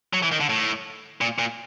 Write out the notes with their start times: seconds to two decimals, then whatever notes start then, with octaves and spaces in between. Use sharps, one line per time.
0.13 F#3
0.23 E3
0.32 D#3
0.40 D3
0.49 A2
1.21 A#2
1.39 A#2